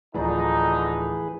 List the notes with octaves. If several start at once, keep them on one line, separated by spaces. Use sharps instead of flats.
D1 D3 E3 F3 D4 D#4 G#4 B4